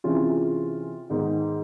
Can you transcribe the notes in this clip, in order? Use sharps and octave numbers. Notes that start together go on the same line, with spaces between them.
C3 E3 G#3 C#4 F4
G#2 D#3 G#3 B3 D#4